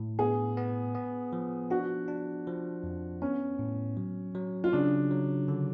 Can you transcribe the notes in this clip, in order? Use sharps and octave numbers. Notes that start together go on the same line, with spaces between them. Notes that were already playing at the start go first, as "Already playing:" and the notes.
Already playing: A2
B3 G#4
B3
B3
F3
D4 F#4
D4
F3
F2
B3 C#4
A2
F#3
F#3
F4
C#3 D4
F#3
D3